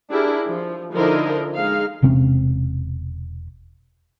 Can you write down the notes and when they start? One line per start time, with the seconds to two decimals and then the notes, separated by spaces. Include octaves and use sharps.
0.11 D4 E4 G4 G#4 A#4
0.47 F3
0.94 D3 F3 D#4 E4 A#4 D#5
1.54 G#3 D#4 F5
2.02 E1 C3 C4 C#4